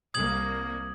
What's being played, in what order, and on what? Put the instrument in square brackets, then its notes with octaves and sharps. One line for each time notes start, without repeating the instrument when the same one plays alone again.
[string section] C2 A#3 [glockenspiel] D#6 G#6 F#7